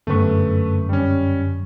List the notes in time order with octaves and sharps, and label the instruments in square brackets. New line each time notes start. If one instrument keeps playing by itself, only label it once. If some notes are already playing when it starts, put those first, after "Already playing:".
[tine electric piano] G1 F#2 C#6 [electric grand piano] A3 B4
[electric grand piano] G3 C#4